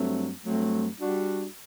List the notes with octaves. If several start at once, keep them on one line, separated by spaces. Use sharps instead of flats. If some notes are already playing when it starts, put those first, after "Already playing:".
Already playing: G2 F#3 A3 C4
G2 F#3 A3 C4
G3 D4 F#4